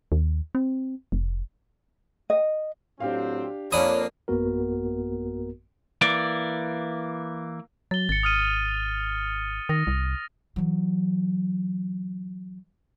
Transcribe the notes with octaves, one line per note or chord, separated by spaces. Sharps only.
D#2
C4
F1
D#5
A2 F#3 C4 D4 G4 F5
F2 F3 A#3 D4 C#5 B5 D#6
A1 F#2 A#3 B3 F#4 A#4
E3 A#3 D5
F#3 A6 G7
G#1 A6 C#7
D#6 F6 D#7
D#3 D#6 A#6
C2
E3 F#3